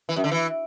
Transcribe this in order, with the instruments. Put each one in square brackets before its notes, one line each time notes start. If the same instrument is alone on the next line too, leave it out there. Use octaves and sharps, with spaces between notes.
[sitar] E3
F#2
D3
E3